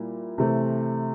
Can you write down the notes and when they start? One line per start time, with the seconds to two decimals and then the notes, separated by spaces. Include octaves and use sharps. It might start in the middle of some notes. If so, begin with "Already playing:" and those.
Already playing: A#2 G3 E4
0.38 C3 E3 A3 C4